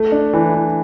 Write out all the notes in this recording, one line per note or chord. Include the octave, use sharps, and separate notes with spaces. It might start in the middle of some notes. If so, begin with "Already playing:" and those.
Already playing: A3
D4
E3
E3